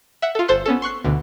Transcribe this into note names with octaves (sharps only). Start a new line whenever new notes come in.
E5 F#5
F4 A4
G1 A4 C5 C6 F#6
B3 C#4 A4
C6 C#6 F#6 C7
D2 B2 D3